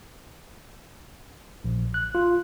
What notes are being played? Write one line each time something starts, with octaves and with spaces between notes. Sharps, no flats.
A#1
F#6
F4